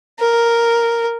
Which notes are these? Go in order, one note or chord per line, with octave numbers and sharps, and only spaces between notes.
A#4